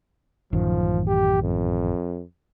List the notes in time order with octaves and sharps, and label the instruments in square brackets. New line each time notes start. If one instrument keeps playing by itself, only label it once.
[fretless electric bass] A1 F#2 D#3 [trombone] F3
[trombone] G4
F2